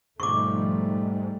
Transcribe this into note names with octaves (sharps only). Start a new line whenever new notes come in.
G#2 B2 D#3 F3 G3 A3 C#6 D6